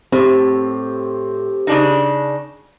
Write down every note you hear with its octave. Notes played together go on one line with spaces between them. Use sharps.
A2 C4 G4
C#3 D4 D#4